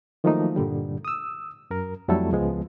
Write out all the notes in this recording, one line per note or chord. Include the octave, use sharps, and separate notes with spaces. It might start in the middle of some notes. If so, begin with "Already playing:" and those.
D#3 F3 F#3 A3 A#3 D#4
G2 A#2 D3 G3
D#6 E6
F#2 A#4
F2 F#3 G3 A3 E4 A4
C#2 F3 G#3 B3